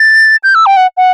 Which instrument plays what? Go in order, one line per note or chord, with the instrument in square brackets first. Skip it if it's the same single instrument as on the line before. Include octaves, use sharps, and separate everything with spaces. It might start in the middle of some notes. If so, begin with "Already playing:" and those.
Already playing: [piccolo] A6
G6
E6
G5
F#5
F#5